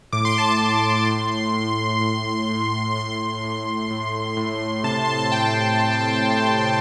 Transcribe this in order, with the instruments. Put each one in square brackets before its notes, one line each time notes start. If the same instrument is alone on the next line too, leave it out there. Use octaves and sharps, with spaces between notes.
[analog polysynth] A2 D6
C6
A5
C6
A2
A2
A2
A2
A2
A2 C6
A2
A2
A2
C3 A5
C6
A5
C3 G5